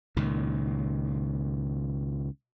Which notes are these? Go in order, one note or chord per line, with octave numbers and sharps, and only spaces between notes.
C#2 A#2 D#3